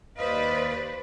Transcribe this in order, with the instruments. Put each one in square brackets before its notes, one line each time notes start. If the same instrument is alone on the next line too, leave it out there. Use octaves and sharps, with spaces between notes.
[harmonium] D#2 D#5 F5 [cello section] B4 C5 D5